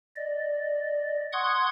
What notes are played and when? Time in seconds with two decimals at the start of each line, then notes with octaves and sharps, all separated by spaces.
0.16 D5 D#5
1.33 F#5 C6 C#6 D#6 F#6 G#6